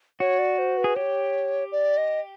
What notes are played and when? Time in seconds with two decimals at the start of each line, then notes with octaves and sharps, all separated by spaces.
0.20 F#4 C#5
0.39 D5
0.58 C5
0.77 B4
0.84 G#4
0.96 G4 C#5
1.72 D5
1.97 D#5